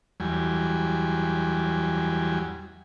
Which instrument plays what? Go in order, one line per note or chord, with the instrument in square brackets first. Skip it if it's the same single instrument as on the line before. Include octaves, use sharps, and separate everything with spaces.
[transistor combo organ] E2 F#3 G3 G#5